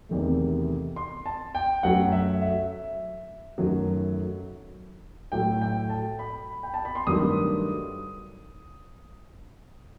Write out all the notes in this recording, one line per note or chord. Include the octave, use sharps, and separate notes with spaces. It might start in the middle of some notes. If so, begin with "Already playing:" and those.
E2 C3 D#3 A3
C6
A5
G5
F#2 F#3 A3 F#5
E5
E5
F#2 D#3 F#3 A3
A2 F#3 A3 G5
G5
A5
B5
G5
A5
B5
C6
G2 D#3 F#3 A3 D#6